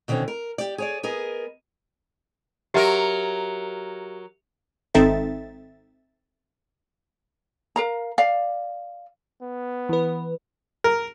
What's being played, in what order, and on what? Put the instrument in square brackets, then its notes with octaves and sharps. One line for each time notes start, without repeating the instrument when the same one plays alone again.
[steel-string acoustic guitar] B2 D3 D#3 C4 C#4
A#4
G4 D5
G#4 C#5 D5
B3 G#4 A#4 D#5
[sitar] F#3 A#4 [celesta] G4 E5 A#5
[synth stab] G#1 C4 D#4 A4 E5 A6
[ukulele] A#4 F5 A#5
D5 F5
[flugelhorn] B3
[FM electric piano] E3 B4
[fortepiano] A#4